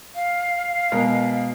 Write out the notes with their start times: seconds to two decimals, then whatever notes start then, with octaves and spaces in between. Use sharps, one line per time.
0.15 F5
0.92 B2 G#3 A#4